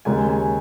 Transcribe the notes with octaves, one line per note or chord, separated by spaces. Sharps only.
D#2 C#3 G#3 G#5
G#5